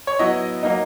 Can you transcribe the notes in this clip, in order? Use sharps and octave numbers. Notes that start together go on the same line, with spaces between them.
C#5
F#3 B3 E4 D#5
F#3 A#3 D#4